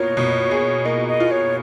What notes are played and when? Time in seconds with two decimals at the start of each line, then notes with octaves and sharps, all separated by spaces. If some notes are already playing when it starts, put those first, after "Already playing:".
Already playing: B2 A#3 F4 C#5
0.17 B2
0.51 G#4
0.85 A#3 D#5
1.08 D#5
1.20 F4
1.31 C#5